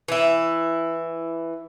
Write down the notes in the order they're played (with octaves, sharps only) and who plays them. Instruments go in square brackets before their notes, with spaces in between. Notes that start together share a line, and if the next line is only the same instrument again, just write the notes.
[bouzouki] E3 E4